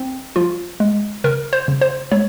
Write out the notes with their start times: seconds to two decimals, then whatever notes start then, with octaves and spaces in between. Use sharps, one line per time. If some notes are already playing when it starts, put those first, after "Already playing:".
Already playing: C4
0.36 F3 F4
0.80 G#3
1.24 C#3 A#4
1.53 C5
1.68 C#3
1.81 C5
2.11 G#3 C#5